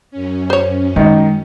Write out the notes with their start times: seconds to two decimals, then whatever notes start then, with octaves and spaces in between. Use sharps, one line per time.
0.11 F#2 C#4
0.50 C5 C#5
0.96 D#3 G#3 D#4